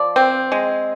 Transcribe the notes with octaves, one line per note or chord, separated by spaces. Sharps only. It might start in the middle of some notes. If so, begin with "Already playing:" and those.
Already playing: F3 D5
C4
G#3